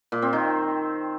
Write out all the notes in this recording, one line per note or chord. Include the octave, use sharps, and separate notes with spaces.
A#2
C4
D#3